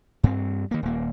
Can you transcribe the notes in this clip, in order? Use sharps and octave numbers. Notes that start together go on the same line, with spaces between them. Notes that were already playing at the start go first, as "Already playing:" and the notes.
G2 C4
D#3 A#3
D#1 A#3